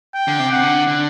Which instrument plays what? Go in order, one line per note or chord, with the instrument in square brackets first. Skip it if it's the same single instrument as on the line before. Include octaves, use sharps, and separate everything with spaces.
[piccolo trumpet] G5
[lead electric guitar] D3
C3
[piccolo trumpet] F#5
[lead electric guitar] D3
D3